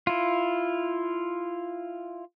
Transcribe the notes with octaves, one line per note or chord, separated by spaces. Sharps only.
E4 F4